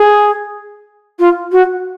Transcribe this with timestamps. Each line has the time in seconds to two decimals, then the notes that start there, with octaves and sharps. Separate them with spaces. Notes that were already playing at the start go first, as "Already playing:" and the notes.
Already playing: G#4
1.19 F4
1.52 F#4